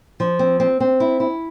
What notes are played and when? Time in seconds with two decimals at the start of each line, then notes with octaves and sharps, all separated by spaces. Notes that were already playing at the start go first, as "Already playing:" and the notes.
0.20 F3
0.39 C4
0.60 C4
0.80 C4
1.00 E4
1.20 E4